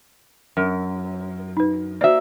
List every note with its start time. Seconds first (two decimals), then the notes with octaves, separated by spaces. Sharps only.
0.57 F#2 A#4
1.57 D#4 B4
2.01 A#3 F#4 C5 D5 E5